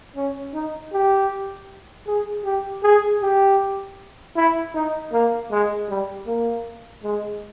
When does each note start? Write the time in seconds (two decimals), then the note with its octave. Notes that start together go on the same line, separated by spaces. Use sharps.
0.16 C#4
0.54 D#4
0.93 G4
2.07 G#4
2.45 G4
2.83 G#4
3.22 G4
4.36 E4
4.74 D#4
5.12 A#3
5.51 G#3
5.89 G3
6.27 A#3
7.03 G#3